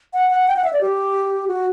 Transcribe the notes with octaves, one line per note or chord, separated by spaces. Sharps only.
F#5
F#5
G5
F#5
E5
D5
G4
F#4